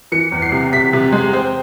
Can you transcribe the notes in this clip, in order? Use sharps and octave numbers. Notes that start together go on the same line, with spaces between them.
E3 C#7
E2
C7
C3
C3 B6
C3
G#3
C4